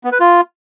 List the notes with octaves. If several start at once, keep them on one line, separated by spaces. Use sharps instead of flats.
B3
B4
F4